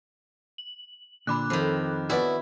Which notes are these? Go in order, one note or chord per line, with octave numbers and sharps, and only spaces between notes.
F#7
A#2 D3 B5 D6 F#6
F2 D#3 C4
B3 C#4 E4 F#4 D5